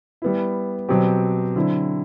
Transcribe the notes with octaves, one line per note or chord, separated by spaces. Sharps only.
G3 B3 E4
B2 F#3 C4 G4
D3 F#3 C4 E4